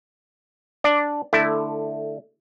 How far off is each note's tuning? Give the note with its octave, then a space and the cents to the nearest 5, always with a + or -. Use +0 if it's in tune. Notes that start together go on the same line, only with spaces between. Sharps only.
D4 +0 D5 +0
D3 +15 A3 +0 E4 +0